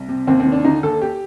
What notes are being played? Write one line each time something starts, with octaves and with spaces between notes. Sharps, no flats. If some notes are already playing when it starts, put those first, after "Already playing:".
Already playing: C2
C3
D#2 C4
C4
D#3
D4
D3 D#4
D#2 A4
G4